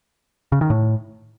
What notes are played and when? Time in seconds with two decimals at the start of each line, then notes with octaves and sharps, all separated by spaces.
0.52 C#3
0.61 D#3
0.70 A2